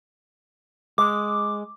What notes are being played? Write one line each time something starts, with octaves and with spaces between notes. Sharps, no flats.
G#3 D6